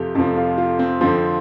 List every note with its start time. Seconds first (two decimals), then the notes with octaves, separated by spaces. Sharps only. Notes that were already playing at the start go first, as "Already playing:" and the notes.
Already playing: F2 C3 F3 G4 A4
0.15 F2 C3 F3 A4
0.36 F4
0.58 F4
0.79 C4
1.01 F2 D3 F3 C4